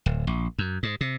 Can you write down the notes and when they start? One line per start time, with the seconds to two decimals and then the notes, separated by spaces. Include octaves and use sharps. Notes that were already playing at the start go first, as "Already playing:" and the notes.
0.06 D1
0.27 A#1
0.58 F#2
0.83 G#2
1.01 C3